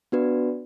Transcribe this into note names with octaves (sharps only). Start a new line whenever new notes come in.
B3 D4 F#4 B4 D5